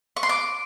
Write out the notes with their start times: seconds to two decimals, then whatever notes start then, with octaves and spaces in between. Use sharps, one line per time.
0.17 C#6
0.23 C6
0.29 D6